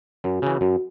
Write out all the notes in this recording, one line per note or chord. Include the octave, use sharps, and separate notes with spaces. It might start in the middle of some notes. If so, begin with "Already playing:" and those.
F#2 F#4
C#3 E3
F#2 F#4